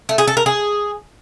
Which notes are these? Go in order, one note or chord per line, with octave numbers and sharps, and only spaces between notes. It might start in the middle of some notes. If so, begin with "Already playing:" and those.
A3
G#4
A4
A#4
G#4